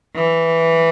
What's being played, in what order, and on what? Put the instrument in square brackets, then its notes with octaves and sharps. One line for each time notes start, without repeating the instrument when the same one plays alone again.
[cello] E3